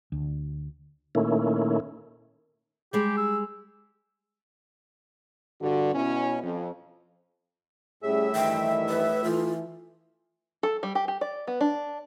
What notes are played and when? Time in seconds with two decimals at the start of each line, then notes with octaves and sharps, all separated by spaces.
0.12 D2
1.15 A#2 D#3 A3 A#3 C#4 E4
2.93 G3 G#3 G4 G#4
3.17 E6
5.61 G2 D3 F#4
5.95 B2 C#4 E4
6.43 F2
8.03 A2 G3 C#4 G#4 E5
8.35 G2 D#3 E3 G5
8.89 B4
9.24 E3 A3 F4
10.63 A4
10.83 G3
10.95 G4
11.08 G4
11.21 D5
11.47 B3
11.61 D4